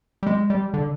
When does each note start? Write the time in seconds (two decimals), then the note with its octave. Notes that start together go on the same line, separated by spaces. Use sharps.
0.23 G3
0.27 G#3
0.50 G3
0.74 D3